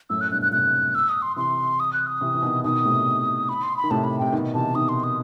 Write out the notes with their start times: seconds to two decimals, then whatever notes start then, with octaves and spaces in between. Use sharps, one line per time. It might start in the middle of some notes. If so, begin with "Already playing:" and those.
0.10 F#2 A2 E6
0.21 F#6
0.31 G2 B2 F#6
0.42 F#6
0.47 B2
0.52 A2 C3 F#6
0.95 E6
1.09 D#6
1.22 C6
1.36 C3 E3 C6
1.80 D#6
1.93 F#6
2.07 D#6
2.21 C3 E3
2.34 E3
2.43 B2 D#3
2.64 B2 D#3 D#6
2.85 A2 C3
3.49 B5
3.63 C6
3.77 B5
3.84 D#3
3.91 A2 C3 A5
4.04 B5
4.19 C3 G5
4.33 B2 D#3
4.54 C3 E3 A5
4.75 B2 D#3 D#6
4.89 C6
5.04 D#6